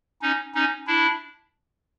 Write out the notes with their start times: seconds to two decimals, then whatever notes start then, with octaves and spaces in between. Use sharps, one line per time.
0.22 C#4 D#4
0.54 C#4 D#4
0.87 D4 E4